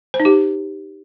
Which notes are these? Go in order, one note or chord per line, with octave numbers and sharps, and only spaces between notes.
C5
D#4
G4